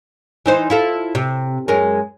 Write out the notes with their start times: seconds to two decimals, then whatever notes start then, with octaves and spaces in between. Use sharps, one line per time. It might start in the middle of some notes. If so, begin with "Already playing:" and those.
0.46 E3 D#4 C5
0.70 E4 F4 A4
1.15 C3
1.68 F#2 G#3 A#4